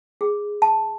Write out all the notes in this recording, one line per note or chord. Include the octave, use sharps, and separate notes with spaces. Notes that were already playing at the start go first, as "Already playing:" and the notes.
G#4
A5